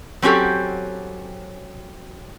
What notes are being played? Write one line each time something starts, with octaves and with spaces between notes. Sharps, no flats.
F#3 C4 C#4 F#4 G4 A4